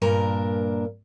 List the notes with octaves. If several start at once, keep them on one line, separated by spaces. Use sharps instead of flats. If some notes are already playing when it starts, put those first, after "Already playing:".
G2 A#2 D4 A#4 A#5